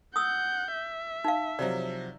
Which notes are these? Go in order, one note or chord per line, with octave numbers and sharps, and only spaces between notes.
F#5 D#6 E6 G6
E5
D#4 F5
C3 F3 F#3 D5